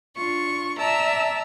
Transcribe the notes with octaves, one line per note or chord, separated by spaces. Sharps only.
D4 F4 C#6
D5 E5 A5 A#5 E6